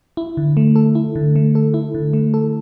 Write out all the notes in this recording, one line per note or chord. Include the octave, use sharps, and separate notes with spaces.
E4
D3
A3
A4
E4
D3
A3
A4
E4
D3
A3
A4